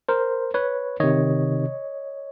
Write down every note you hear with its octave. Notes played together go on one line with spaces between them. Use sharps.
A#4 C5
B4 C#5
C3 D#3 C#5 D#5